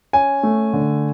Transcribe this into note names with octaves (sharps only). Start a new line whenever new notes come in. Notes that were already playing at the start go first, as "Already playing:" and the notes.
C#4 G#5
A3
D3